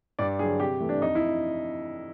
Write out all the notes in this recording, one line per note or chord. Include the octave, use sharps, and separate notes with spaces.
G2 D5
D3 F#3 G#4
C3 G4
E3 A3
D4
F2 D#4
E4